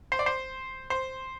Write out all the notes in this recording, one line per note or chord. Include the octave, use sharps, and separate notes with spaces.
C5
D5
C5
C5